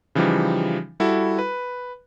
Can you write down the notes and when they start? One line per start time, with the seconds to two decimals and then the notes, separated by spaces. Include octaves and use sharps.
0.15 C#3 E3 F3 G3 D#4 G4
1.00 G3 E4 F#4 A4
1.39 B4